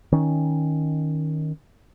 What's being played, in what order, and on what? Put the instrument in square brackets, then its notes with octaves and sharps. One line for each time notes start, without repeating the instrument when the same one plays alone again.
[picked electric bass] D#3 C#4